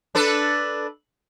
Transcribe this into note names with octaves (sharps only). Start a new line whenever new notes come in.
D4 A4 B4